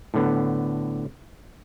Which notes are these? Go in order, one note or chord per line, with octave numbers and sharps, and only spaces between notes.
A2 D3 B3